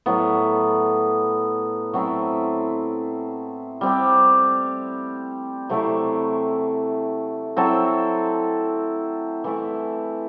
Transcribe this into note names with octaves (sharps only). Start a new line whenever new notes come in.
A2 F#3 B3
F#3 A3 C4 E4
G3 C4 G4
C3 F#3 A3 E4
F#3 C4 E4 A4
E3 A3 E4